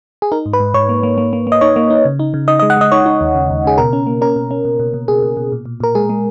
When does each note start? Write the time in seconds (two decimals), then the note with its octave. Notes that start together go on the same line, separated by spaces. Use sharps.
0.22 G#4
0.32 D#4 A#4
0.46 G#2
0.53 B4
0.60 G#2
0.74 G#2 C#5
0.89 A#3
1.03 A#3
1.18 A#3
1.33 A#3
1.47 A#3
1.52 D#5
1.61 D#4 C#5
1.76 A#3
1.90 D#4
2.05 C#3
2.19 D#4
2.34 C#3
2.48 D#4 D#5
2.59 D#5
2.62 G#3
2.70 F#5
2.77 G#3 D#5
2.92 D#4 C#5
3.06 D#4
3.21 D#2
3.35 C#3
3.50 D#2
3.64 C#3 G#4
3.78 B2 A#4
3.93 C#4
4.07 A#3
4.21 C#4 A#4
4.36 B2
4.51 C#4
4.65 B2
4.79 B2
4.94 B2
5.08 B2 G#4
5.22 B2
5.37 B2
5.52 A#2
5.65 A#2
5.80 A#2 A#4
5.95 G#3 G#4
6.10 G#3